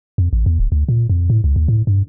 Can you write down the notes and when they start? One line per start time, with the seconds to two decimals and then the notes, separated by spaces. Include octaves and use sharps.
0.18 F2
0.33 A1
0.46 E2
0.59 D1
0.72 D2
0.89 A#2
1.10 F2
1.30 A2
1.44 C#2
1.56 D#2
1.68 A2
1.87 G2